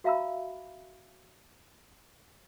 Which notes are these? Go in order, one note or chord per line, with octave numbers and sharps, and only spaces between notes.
F#4 E5 F5 A#5 B5 E6